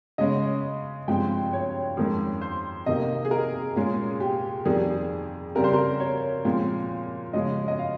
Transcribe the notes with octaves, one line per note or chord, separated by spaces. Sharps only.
C#3 G#3 C#4 D#5
G2 F3 G#3 C4 G5
C#5
F2 D#3 G#3 C#4
C5
C3 D#3 A#3 D#5
G#4
A#4
A#2 G#3 C#4 G#4
G4
F2 D#3 G3 G#4
C#3 G3 C4 A#4
C5
A#4
C#5
A#2 F3 G#3 C4
C#3 F3 G#3 C#4 D#5
D#5
F5